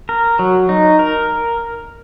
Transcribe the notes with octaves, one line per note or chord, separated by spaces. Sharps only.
A#4
F#3
D#4
A#4